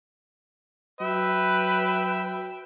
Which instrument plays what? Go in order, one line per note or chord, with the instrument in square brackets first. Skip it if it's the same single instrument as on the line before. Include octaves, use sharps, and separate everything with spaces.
[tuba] F#3 [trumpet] B4 [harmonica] E5 G5